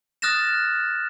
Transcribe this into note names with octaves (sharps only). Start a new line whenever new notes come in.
D#6 F6 F#6 A6 A#6 E7